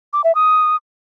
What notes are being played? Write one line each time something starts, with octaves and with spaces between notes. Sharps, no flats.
D6
E5
D#6